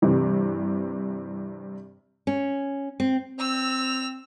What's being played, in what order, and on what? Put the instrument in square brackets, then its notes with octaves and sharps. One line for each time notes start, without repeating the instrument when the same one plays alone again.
[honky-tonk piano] G2 C3 E3
[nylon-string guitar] C#4
C4
[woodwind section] C4 [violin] E6 F7